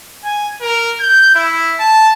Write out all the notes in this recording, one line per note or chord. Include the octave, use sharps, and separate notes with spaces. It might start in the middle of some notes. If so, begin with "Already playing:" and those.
G#5
A#4
G6
E4
A5